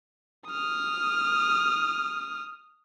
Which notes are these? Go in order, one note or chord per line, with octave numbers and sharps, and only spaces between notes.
D#6 F6